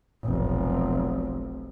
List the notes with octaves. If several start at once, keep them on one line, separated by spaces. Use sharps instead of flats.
F1 B1